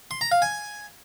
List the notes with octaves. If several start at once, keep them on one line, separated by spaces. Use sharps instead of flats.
C6
A#5
F5
G#5